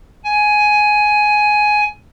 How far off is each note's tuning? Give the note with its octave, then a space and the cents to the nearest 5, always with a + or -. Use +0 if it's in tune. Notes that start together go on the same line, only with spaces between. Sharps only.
G#5 +10